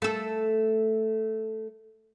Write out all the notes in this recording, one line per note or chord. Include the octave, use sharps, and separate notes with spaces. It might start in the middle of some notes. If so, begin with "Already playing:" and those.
A3 A4